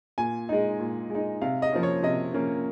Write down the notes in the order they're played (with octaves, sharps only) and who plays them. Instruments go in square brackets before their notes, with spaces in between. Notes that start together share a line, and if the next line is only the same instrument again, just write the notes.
[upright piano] A#2 G#5
G#3 D#4
A#2
G#3 D#4
C3 F5
D#5
F3 A#3 C#4
C#5
C3 D#5
F3 A#3 C#4